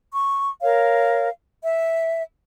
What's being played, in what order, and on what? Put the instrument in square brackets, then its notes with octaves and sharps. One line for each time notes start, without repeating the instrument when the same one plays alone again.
[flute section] C#6
A#4 C#5 F5
E5